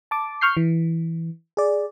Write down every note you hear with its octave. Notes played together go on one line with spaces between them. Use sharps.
A5 D6
C#6 F6 G6 C7
E3
G#4 D5